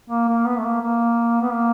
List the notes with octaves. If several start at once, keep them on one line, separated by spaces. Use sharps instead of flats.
A#3
A#3
B3
A3
A#3
A#3
B3
A#3